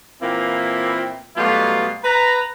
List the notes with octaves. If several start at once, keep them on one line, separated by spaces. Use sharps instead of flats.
A#2 E3 A#3 C4 E4
B2 F#3 G3 A3 D#4 F4
B4 A#5